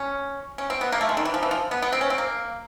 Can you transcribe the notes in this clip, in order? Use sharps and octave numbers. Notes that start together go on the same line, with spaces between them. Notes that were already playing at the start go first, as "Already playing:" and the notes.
Already playing: C#4
C#4
C4
B3
A#3
A3
G#3
D#3
E3
F3
E3
F3
B3
B3
C4
C#4
C4
A#3